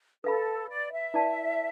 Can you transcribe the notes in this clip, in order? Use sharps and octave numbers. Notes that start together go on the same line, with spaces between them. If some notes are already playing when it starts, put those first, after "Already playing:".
A4 B4 F5 B5
D5
E5
E4 B4 D5 A5